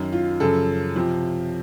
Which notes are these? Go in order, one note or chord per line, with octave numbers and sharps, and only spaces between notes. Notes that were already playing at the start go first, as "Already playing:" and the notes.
Already playing: F#2 D#3
F4
F#2 C#3 F3 A4
C3 F3